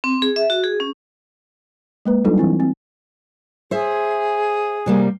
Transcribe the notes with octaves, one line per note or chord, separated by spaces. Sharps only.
C4
G#4
E5
F#4
G#4
C#4
G#3 A#3 B4
F#3 G3 D4 D#4 F4 A4
E3 C4 E4
C4
G#4 C5 E5
C3 G3 A#3